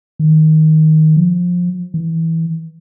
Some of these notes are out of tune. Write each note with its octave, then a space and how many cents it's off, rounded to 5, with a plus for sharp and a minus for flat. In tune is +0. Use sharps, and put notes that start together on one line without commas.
D#3 +10
F3 +20
E3 -15